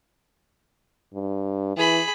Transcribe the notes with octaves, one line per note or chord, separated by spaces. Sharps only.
G2
E3 G#4 B5